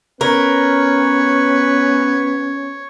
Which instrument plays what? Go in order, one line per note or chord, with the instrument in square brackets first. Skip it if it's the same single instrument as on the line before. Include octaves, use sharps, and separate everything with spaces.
[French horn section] B3 C#4 [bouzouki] A#4 [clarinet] B4 [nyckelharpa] C#5